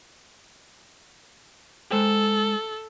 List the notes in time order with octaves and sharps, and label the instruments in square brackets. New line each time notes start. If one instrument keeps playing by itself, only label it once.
[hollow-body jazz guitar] G#3 C5 G5 [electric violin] A4